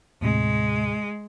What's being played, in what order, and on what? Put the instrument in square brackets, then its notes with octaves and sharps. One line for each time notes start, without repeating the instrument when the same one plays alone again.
[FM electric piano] D#2 A2 C3 [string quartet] G#3